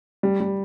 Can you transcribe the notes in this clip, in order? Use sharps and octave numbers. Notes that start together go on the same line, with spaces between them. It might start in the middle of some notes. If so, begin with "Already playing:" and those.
G3
G3